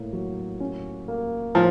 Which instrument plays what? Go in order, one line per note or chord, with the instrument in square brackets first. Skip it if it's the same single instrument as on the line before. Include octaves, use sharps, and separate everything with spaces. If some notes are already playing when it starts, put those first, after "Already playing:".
Already playing: [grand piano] A2 A#3
F#3
C#4
A#3
[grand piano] A2 [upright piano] F3